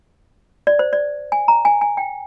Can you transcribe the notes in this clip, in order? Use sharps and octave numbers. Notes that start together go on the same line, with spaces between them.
D5
C5
D5
G#5
A#5
G#5
G#5
G5